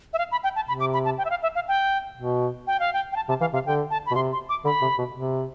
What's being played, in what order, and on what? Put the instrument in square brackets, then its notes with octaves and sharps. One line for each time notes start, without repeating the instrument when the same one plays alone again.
[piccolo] E5
F5
B5
G5
A5
[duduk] C3 [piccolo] B5
[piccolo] D6
B5
A5
G5
E5
F5
E5
F5
G5
[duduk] B2
[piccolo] G5
F5
G5
G5
A5
[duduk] C3 [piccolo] A5
[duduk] E3 [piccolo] F5
[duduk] C3 [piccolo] F5
[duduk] D3 [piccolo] G5
[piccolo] A5
B5
[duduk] B2
[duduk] C3 [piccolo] C6
[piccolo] C6
D6
[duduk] D3 [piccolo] B5
[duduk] C3
B2
C3